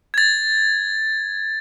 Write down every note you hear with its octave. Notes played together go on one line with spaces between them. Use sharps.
G#6 A6